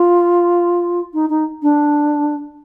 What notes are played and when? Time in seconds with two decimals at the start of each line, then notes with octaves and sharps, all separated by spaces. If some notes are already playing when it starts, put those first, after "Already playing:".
Already playing: F4
1.14 D#4
1.30 D#4
1.62 D4